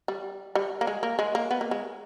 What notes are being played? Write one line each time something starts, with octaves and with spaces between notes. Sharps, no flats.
G3
G3
A#3
G#3
A#3
G#3
A#3
B3
A#3
G#3